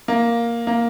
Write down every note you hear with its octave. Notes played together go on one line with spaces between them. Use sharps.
A#3
A#3